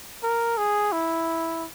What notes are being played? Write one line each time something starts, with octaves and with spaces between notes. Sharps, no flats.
A#4
G#4
E4